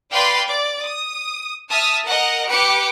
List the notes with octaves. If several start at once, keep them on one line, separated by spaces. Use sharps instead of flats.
B4 D5 F5 G5 B5 C6
D5
D#6
E5 A5 D#6 F6
A#4 D#5 F#5
G4 B4 D6 C#7 D7